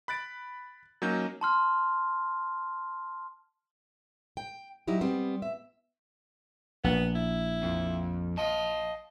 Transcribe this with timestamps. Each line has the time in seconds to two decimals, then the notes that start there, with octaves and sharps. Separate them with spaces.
0.08 B5 F#6 A6 D7
1.02 F#3 A#3 C#4 D#4 G6
1.41 A5 C6 F6
4.37 G5
4.87 F#3 G3 D#4 E4 G4
5.01 G3 B3 C4
5.42 E5
6.84 A#1 B3
7.15 E4
7.63 F2
8.38 D#5 F5 A5